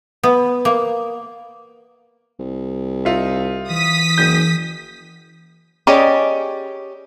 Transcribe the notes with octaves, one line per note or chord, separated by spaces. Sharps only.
B3
A#3
C2
D#4 F4 E5
E3 D#6 B6
F#1 G6
C#4 G4 G#4 D5 D#5